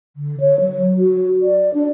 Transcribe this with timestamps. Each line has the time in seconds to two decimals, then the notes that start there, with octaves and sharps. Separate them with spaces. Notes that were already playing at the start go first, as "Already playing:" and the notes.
0.16 D3
0.40 C#5
0.60 F#3
0.98 F#4
1.42 D5
1.74 D4